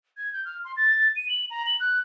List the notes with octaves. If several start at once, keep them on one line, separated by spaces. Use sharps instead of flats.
G#6
G6
F6
C6
A6
D#7
F#7
A#5
F#7
F#6